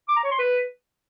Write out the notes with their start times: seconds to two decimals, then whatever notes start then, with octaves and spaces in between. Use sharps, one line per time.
0.09 D6
0.16 A#5
0.24 C#5
0.31 C6
0.39 B4